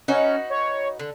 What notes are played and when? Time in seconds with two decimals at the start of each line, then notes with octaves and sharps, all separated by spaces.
0.08 C#4 D#4 F#4 B4
0.50 C#5
0.99 D3